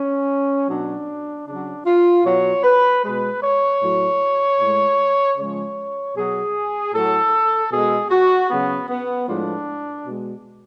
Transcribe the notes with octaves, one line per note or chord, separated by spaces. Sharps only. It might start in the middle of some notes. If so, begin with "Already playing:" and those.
Already playing: C#4
B2 F#3 D4
C#3 F#3 D4
F4
B2 F#3 C#5
B4
B2 G#3 B4
C#5
A2 F#3
A2 G#3
C#3 F3 G#3 C#5
B2 F#3 G#4
A2 F#3 A4
B2 G#3 G#4
F#4
C#3 F#3 B3
B3
A2 F3 G#3 D4
B2 G#3